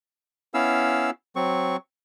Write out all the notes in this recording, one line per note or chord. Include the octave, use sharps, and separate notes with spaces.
B3 C#4 E4 F5 E6
F#3 C4 C#6